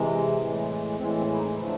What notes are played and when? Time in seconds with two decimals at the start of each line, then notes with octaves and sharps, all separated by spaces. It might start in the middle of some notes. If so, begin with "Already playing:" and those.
Already playing: C3 E3 G#3
0.39 A2 E3 G#3
0.98 A2 E3 G#3 C4
1.17 C4
1.32 E4
1.37 D#4
1.57 D3 F3 A3 E4